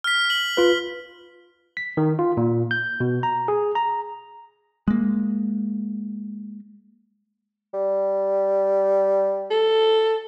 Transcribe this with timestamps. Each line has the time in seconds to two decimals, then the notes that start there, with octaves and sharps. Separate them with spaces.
0.04 F6 B6
0.30 F#7
0.57 F4 B4
1.77 B6
1.97 D#3
2.19 F4
2.37 A#2
2.71 G6
3.00 B2
3.23 A#5
3.48 G#4
3.75 A#5
4.88 G#3 A#3
7.74 G3
9.51 A4